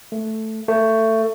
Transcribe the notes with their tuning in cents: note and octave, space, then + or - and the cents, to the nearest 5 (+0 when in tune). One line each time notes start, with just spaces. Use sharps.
A3 +0
A3 +20